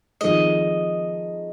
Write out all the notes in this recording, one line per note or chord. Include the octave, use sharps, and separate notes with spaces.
F2 D#3 G#3 D#5